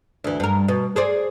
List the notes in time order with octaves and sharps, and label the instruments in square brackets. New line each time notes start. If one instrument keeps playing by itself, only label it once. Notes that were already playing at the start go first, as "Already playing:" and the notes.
[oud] D2 E3
G2 A#4
B2
G#4 C5 D5